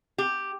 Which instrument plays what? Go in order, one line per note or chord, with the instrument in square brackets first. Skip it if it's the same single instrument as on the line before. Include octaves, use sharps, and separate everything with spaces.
[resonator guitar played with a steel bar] G4